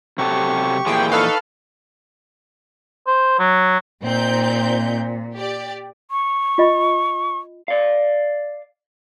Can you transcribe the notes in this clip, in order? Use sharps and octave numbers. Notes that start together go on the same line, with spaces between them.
C3 F#3 G4 A4 C#6
A#2 E3 F3 G#4 G5
D#4 A4 B4 F5 C#6
C5
F#3
A#2 C4 D#4 G6
G4 D5
C#6
F4 D#5 B5
D5 F5